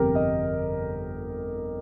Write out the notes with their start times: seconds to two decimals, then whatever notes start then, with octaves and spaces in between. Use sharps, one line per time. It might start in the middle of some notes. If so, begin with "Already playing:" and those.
Already playing: G1 F2 C3 G4 A#4
0.15 D#5